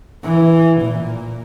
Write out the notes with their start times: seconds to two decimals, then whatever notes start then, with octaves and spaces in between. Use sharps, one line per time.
0.23 E3
0.81 A#2